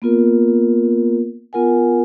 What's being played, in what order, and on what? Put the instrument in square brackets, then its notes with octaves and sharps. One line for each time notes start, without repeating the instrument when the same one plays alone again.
[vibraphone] A#3 B3 F4 A#4
B3 F4 A#4 F#5 G#5